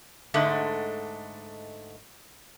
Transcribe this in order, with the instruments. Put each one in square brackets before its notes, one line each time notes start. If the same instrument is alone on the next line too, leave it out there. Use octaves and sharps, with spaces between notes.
[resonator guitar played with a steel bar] G#2 D3 G#3 A3